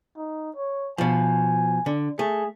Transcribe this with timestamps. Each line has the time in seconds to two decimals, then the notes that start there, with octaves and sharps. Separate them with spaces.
0.17 D#4
0.56 C#5
0.98 B2 F3 G#5
1.86 D3
2.19 A3 G#4